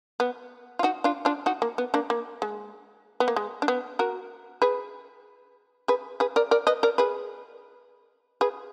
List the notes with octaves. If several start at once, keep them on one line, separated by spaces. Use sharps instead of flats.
B3
F4
D#4 F#4
D4 F4
D4 F4
D#4 F#4
A#3
B3
A#3 D4
A#3
G#3
B3
A#3
G#3
D4
B3
F#4 A#4
G#4 B4
G#4 B4
G#4 B4
A#4 D5
A#4 D5
B4 D#5
A#4 D5
G#4 B4
G#4 B4